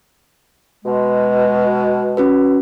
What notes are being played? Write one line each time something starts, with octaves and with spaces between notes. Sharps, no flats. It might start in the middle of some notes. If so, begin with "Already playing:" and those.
B2 G#3
C#4 F#4 B4